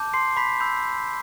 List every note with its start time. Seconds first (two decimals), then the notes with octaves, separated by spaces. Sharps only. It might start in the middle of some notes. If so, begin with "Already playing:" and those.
Already playing: A5 D6 G6
0.14 C6 C7
0.37 B5 B6
0.60 B5 E6 G6